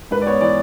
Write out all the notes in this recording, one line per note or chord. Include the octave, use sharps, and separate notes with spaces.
G#2 B4
D5
B3 C#5
E3 D5